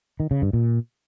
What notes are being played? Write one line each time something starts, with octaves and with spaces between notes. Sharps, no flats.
D#3
C#3
G2
A#2